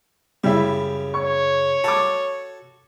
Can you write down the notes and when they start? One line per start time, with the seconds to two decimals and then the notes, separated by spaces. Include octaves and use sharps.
0.44 F#2 C#3 G3 E4 E5
1.14 C#5 C#6
1.84 F#4 A4 A5 D6